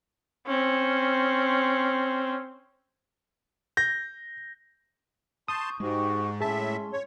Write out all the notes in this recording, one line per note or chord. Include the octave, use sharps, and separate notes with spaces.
C4 C#4
G6 A#6
A5 C6 C#6 D#6 G6
G#2 G#3 F#4 G4 C#6
A2 C#4 G#4 E5 A5 C6
C#5